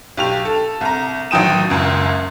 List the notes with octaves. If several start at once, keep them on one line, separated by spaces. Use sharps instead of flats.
B1 G4 F7
A4
C2 A#5
A1 D#3 F#3 G5 D#6 E7
F#1 C#2 F#2